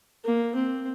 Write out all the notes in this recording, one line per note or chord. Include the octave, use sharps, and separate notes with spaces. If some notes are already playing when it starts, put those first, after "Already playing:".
A#3
C4